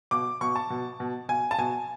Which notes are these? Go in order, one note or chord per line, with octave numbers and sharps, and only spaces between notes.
B2 D6
B2 C#6
A5
B2
B2
B2 G#5
A5
B2 G#5